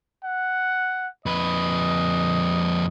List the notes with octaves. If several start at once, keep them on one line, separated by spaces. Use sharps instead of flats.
F#5
F2 B4 D#5